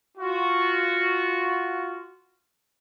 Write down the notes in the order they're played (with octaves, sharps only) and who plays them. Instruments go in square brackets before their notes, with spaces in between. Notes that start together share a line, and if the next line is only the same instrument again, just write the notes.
[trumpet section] F4 F#4